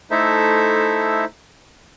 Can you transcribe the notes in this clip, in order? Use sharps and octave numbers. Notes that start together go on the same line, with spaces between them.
A3 D#4 E4 A4 C5 E5